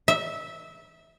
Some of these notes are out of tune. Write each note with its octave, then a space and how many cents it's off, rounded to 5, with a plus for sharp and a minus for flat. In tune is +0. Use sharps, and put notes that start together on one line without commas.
E5 -15